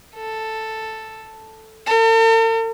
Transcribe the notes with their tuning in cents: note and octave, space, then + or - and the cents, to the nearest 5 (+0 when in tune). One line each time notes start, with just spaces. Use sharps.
A4 +5
A4 +45